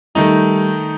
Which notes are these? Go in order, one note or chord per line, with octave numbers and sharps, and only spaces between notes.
D#3 G3 A3 D#4